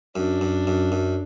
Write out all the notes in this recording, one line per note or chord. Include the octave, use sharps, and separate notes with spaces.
F#2 D4
F#2
F#2
F#2